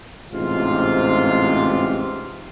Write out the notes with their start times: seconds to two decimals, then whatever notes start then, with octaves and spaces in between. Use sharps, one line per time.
0.32 A1 G#2 C3 D#4 F4